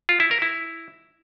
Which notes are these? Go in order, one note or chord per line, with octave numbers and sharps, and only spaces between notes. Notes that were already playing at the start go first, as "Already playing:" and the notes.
F4
E4
A#4
E4